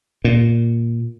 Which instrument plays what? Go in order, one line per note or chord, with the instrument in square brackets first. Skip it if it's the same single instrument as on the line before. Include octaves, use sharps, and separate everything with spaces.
[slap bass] A#2